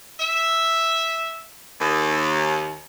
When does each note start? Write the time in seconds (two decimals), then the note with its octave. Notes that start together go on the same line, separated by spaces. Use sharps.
0.20 E5
1.80 D#2